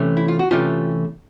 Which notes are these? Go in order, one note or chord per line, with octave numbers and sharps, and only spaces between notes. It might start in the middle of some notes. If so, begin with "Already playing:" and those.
Already playing: C3 E3 A3 C#4
E4
F4
F#4
C3 E3 A3 C#4 F4 G4